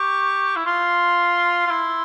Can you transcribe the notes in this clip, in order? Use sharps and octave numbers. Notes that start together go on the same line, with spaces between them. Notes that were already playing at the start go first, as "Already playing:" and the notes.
Already playing: G4 C#6
E4
F4 C6
F4
E4